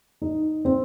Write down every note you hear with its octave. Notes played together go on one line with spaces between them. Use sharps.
D#4
C4